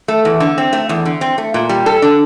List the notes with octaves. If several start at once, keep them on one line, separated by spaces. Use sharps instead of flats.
A3
E2
D3
C4
A3
E2
D3
C4
A3
A#2
G3
A4
D4